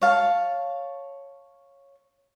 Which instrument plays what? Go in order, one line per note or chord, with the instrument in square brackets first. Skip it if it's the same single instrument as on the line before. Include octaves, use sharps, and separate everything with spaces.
[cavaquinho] C#5 F5 A5